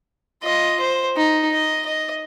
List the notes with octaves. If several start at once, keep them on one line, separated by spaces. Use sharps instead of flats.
F4 D#5
C5
D#4
D#5
D#5